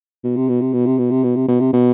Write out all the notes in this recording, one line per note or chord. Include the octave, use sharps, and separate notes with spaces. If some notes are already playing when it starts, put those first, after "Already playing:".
B2
C3
B2
C3
B2
C3
B2
C3
B2
C3
B2
C3
B2